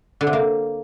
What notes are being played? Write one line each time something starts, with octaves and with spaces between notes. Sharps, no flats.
D3
C3
A#3